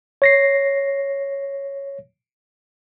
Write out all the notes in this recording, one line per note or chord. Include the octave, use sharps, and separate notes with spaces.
C#5 A#6 C7